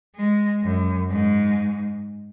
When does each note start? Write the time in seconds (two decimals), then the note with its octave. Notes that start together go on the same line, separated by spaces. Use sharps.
0.16 G#3
0.64 F#2
1.11 G#2